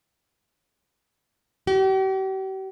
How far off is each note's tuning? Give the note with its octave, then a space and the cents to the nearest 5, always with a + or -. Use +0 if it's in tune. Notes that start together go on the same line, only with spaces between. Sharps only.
G4 -45